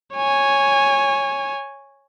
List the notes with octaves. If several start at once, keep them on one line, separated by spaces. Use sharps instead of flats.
C#5 G#5